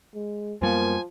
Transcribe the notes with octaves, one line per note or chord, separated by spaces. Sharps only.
G#3
F#2 F3 G3 A#3 B3 G#5